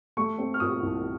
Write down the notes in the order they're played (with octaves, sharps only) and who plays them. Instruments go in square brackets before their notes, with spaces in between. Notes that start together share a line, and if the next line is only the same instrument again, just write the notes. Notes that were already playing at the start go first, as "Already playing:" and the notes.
[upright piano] A3 C#6
C4
F6
A#2 D#6
C2